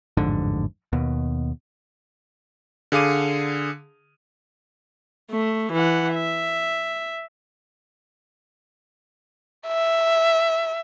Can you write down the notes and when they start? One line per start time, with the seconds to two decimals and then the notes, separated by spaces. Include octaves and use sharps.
0.17 A1 F2 G#2 D3
0.93 D#2 B2
2.92 D3 G#4 F5 D6 D#7
5.31 A3
5.73 E3 F#5
6.14 E5
9.67 E5